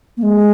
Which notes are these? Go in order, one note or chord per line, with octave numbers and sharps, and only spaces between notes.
A#3
G#3